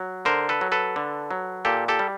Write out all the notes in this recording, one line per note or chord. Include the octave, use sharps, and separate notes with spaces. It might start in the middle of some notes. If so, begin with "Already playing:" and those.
Already playing: F#3
D3 A#4 C5
A4 B4
F#3
A4 B4
D3
F#3
A#2 G4 A4
G4 A4
G3